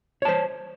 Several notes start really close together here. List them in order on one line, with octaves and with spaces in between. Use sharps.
C#5 A5 C5